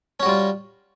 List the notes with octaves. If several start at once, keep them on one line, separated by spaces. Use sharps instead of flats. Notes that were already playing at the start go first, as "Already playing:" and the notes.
G3 C#4 F4 F#4